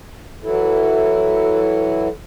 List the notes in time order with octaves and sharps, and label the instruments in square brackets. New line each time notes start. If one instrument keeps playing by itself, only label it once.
[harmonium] E3 F#3 E4 [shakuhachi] A4